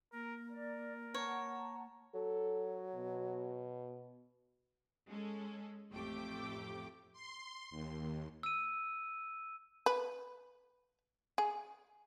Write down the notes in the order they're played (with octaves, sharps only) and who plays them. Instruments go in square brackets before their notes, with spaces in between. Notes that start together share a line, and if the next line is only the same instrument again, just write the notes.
[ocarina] A#3 [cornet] A#4
[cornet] A#4 [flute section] D5
[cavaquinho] C#5 [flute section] F#5 A5 A#5
[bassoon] F#3 [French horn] A4
[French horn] B2
[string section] G#3 C#4 A4
A1 F2 A3 G4 G5 D6
[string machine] C6
D#2
[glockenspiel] E6 D#7
[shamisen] B4
G#4